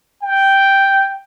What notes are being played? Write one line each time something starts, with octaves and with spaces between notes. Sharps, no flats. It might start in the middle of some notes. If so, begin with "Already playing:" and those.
G5